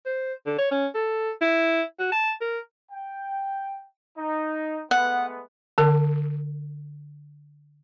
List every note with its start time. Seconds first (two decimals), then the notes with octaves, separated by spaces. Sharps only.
0.06 C5
0.46 D3
0.58 C#5
0.71 C#4
0.94 A4
1.41 E4
1.99 F#4
2.12 A5
2.41 A#4
2.91 G5
4.17 D#4
4.91 G#3 A3 B3 F#5
5.78 D3 A#4